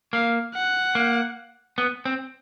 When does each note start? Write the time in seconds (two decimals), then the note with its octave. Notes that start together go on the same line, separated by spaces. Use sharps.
0.13 A#3 F5
0.54 F#5
0.95 A#3
1.78 B3
2.05 C4